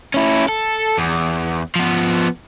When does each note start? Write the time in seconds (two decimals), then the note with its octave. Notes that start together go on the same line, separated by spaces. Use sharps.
0.14 C#4 E4
0.49 A4
0.98 E2
1.76 F3 B3